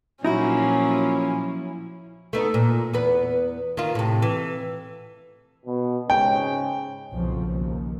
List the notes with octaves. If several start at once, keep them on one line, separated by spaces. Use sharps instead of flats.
A#2 F3 F#3 C#4 D#4 E4 F#4
A3 B3 D#4
A#2
E2 B3 B4
D#3 F4
A2 C3
E3
B2
G#2 C#3 G#3 G5
B1 F2 A#2 C#3 F3
D#2